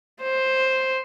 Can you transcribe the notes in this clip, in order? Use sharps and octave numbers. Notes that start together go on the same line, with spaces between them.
C5